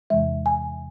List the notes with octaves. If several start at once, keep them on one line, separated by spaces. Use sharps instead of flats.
E2 C3 E3 G#3 E5
G#5